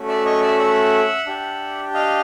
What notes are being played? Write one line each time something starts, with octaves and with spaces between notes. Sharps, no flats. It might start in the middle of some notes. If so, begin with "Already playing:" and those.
Already playing: A3 C#4 F#4
D5 E5
C#5 D#5
D5 E5
E5 F#5
D4 G4
D#5 F5